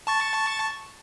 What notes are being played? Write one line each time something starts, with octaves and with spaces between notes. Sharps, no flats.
A5 C#6 A6